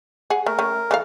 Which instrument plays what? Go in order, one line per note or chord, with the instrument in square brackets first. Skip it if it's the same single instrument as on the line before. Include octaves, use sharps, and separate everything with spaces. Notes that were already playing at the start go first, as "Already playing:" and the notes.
[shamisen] G#4 F#5
[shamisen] A3 [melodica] A#4
[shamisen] A3 C#4
E3 A4 F5